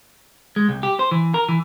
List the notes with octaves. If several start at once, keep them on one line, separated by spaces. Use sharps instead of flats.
G#3
C2
G4
C5
E3
A#4
E3